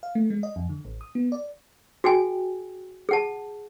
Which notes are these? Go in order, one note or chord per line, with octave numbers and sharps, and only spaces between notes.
F5
A3
G#3
D#5
F2
D3
A1
D#6
B3
D5
F#4 G#4 G5 G#5
G#4 F#5 A5